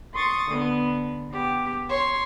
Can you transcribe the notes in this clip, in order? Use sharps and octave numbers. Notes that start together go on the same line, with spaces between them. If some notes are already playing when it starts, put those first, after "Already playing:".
C6 C#6 D#6 A6
D3 B3
B3 G4
C#5 C6